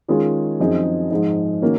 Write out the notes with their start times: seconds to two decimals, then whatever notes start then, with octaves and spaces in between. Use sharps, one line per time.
0.08 D#3 G#3 C#4 F4 G#4
0.60 F#2 F3 C4 D#4 G#4
1.10 G#2 F3 G#3 D#4
1.62 D#3 A#3 C#4 F#4